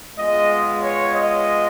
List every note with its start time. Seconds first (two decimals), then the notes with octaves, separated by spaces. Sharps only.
0.16 G#3 B3 F4 D#5
0.80 C#5
1.12 D#5